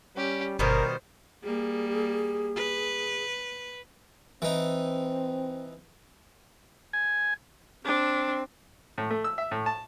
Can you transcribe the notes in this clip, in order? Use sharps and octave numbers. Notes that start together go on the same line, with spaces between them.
G3 C#4 G4
G1 B2 D#3 G3 A#4 C5
G3 A#3 G#4
B4
E3 C4 D#4
G#5
C4 D4
A2
A3
E6
E5
A2
A5